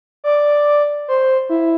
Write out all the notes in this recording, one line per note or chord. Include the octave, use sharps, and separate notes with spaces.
D5
C5
E4